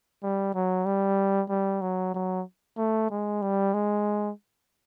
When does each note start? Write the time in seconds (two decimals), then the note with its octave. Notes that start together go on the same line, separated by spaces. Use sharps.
0.23 G3
0.54 F#3
0.85 G3
1.49 G3
1.81 F#3
2.14 F#3
2.77 A3
3.10 G#3
3.42 G3
3.74 G#3